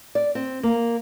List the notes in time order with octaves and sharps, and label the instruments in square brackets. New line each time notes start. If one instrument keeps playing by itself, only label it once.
[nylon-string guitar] D5
C4
A#3